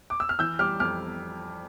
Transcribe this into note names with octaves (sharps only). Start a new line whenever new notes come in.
D6
E6
F6
E3 E6 G6
G3 D6 F6
F2 D6 F6